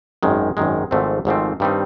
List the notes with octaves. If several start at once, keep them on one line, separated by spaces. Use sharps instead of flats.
G#1 F#2 D#3 G#3
G#1 F#2 D#3 G#3
G#1 G#2 F3 A3 C4
G#1 G#2 F3 A3 C4
G2 D#3 G3 C4 D#4